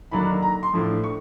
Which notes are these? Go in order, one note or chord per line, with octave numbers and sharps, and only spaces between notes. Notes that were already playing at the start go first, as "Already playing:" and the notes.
D#2 D3 F#3 A#3 D4 B5
A#5
C6
A2 F3 A3 D4
C#6